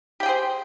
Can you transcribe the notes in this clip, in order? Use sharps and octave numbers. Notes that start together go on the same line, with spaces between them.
G4 G#4 C5 G5